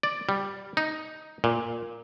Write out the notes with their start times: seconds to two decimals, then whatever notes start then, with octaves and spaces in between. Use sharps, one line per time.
0.03 D5
0.29 G3
0.77 D#4
1.44 A#2